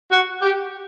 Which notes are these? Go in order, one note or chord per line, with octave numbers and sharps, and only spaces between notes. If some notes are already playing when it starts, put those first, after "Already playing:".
F#4
G4